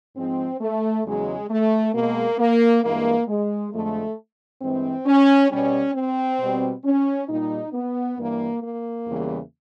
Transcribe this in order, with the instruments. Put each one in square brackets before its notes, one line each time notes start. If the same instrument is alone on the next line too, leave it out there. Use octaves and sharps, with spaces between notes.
[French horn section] G#2 F3 G#3 C4
A3
E2 C#3 F#3 G#3
A3
B2 G#3 A#3
A#3
G2 E3 G#3 A#3
G#3
F2 D3 F3 G#3 A3
G2 E3 G#3 C4
C#4
B2 G3 C#4
C4
B2 G3
C#4
A#2 G3 D#4
B3
G2 E3 G3 A#3
A#3
E2 C#3 E3 G3